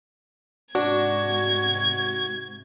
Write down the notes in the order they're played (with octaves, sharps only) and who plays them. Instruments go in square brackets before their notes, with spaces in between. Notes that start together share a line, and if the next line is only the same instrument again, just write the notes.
[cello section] G#2 C3 [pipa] D4 [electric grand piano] F#4 [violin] G#6